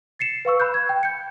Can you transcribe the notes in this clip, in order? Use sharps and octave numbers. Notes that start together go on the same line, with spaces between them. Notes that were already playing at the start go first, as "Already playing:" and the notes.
A6 C7 C#7 E7
B4 F5 C#6 E6
B5 F#6 G6
G#6
G5
G6 C#7